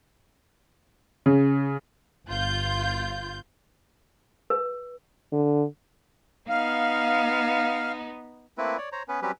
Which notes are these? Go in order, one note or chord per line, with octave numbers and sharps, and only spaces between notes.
C#3
G1 F4 G6
B4
D3
B3 D#4 F5
A3 A#3 C4 E4 B4
C#5 D5
C5 C#5 A#5
B3 C#4 B4
F#3 G3 C4 C#4 G4 B4